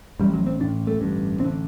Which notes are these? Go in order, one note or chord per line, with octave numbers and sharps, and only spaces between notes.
A1 A2 G3
F#3
C4
A1 A2 D4
A3
A1 G2 D3
A1 C4
D3